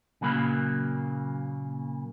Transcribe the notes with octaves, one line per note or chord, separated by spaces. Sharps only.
A#2 C#3 F#3 A#3 B5